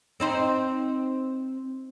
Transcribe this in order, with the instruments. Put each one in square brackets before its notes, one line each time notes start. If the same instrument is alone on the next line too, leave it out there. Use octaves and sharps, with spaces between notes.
[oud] C4 D#4 C5